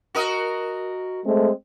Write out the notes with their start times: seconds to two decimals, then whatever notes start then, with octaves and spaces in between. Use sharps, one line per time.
0.15 F#4 A#4 D#5
1.25 G#3 A3 C4